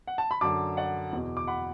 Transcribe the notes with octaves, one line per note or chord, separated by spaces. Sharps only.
F#5
A5
B5
F#2 D3 A5 D6
D5 F#5
E2 B2
D6
F#5 B5